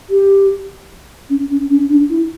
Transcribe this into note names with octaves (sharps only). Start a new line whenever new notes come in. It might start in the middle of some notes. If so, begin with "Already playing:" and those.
G4
C#4
C#4
C#4
D4
E4